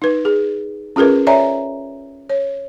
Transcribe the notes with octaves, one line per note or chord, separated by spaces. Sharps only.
D#4 B4
G#4
C#4 F4 G#4 A#4 B4
C#5 D5 E5 G#5 A#5
C#5